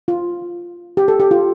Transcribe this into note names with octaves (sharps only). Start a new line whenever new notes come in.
F4
G4
A4
G4
F4